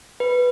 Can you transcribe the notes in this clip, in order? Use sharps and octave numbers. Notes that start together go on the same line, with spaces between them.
B4